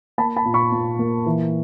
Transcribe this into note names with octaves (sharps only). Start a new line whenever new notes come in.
A#3 A5 B5
A5 B5
A#2
B5 C#6
A#2
A#3
E3